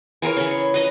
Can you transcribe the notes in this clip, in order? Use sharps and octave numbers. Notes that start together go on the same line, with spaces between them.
E3 G#4 A#4 C#5
C#3 B5
C#6
B4 D#5 A#5